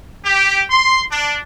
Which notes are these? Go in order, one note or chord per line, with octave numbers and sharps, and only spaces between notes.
G4
C6
D4